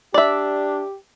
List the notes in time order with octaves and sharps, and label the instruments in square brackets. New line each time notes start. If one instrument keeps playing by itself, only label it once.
[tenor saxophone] D4 [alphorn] G4 [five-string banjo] D5 E5